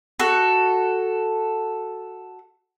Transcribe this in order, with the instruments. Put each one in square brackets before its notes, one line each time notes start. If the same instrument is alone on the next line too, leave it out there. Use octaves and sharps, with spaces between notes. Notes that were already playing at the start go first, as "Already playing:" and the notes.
[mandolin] F#4 A4